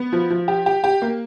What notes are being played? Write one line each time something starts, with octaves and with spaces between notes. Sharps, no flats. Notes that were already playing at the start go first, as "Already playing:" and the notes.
Already playing: B3
F3
F3
G4
G4
G4
A#3